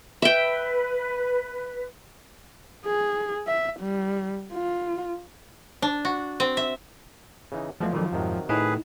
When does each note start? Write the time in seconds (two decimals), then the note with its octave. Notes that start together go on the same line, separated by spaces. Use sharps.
0.22 B4 E5 G5
2.86 G#4
3.47 E5
3.80 G3
4.53 F4
5.82 D4
6.05 F#4
6.40 C4
6.57 E5
7.52 C#3 E3 D#4
7.80 E2 F3 F#3 G#3 A3
7.93 F2 A#2 D#3 F#3
8.12 F2 G#2 C3 D#3 F#3
8.49 A2 D#4 E4 G#4 B4